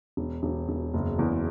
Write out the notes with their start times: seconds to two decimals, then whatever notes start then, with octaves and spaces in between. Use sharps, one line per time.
0.17 E1
0.43 E1
0.69 E1
0.94 F#1
1.19 E2